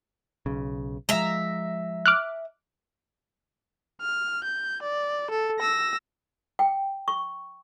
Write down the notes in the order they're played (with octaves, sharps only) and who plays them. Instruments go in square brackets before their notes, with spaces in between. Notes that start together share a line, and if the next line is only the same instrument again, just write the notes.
[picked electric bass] B1 C#3
[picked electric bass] F3 G#3 [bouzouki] E5 A#5
[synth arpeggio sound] D6 F6 F#6
[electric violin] F6
G6
D5
A4
E6 A#6
[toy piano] G5
C#6